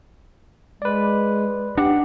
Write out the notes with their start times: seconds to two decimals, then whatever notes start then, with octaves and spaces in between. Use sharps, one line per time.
0.82 G#3 B4 D5
1.78 D4 G4 F#5